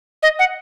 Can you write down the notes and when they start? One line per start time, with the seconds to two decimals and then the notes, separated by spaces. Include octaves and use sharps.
0.23 D#5
0.39 F#5